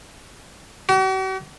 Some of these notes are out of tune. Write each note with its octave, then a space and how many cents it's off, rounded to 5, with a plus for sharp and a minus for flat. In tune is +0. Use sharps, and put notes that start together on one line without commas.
F#4 +45